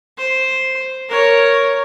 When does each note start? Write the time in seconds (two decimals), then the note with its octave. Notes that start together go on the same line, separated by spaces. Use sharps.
0.18 C5
1.09 A#4 C#5